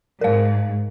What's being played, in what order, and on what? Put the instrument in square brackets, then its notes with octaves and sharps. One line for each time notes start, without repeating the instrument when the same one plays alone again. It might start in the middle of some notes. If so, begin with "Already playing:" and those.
[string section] G#2 [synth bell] A#4 F5